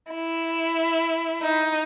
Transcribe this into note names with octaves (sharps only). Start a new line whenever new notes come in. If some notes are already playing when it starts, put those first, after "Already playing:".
E4
D#4